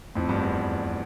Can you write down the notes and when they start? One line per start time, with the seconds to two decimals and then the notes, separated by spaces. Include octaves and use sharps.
0.15 F2 A2
0.29 E2 G2
0.42 E2